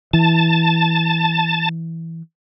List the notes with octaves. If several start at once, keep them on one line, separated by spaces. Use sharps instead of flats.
E3 A5